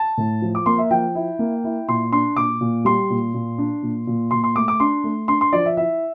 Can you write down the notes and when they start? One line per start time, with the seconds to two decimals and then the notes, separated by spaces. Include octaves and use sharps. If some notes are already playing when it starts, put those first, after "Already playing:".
Already playing: A5
0.18 A2
0.42 F3
0.55 D6
0.66 A#3 C6
0.78 E5
0.91 F3 G5
1.15 E4
1.39 A#3
1.64 E4
1.88 A#2 C6
2.12 D4 C6
2.36 A#2 D6
2.61 A#2
2.85 G3 C6
3.10 A#2
3.34 A#2
3.58 D4
3.83 A#2
4.07 A#2
4.31 A#2 C6
4.44 C6
4.56 A3 D6
4.68 D6
4.80 D4 C6
5.04 A3
5.28 D4 C6
5.41 C6
5.53 F3 D5
5.66 E5
5.77 E4 E5